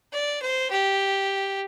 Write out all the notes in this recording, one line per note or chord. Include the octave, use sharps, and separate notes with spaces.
D5
C5
G4